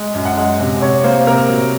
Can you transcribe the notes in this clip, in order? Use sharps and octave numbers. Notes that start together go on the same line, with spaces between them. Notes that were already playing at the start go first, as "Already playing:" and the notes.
Already playing: G#3
F#2
F#5
G#3
C3
C3 C#5
A#3 C5
C3 A#4
F#3